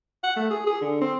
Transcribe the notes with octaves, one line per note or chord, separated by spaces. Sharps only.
F#5
A3
G#4
G#4
D3
C4